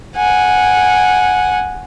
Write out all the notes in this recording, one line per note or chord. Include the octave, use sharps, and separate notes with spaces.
F#5 G#5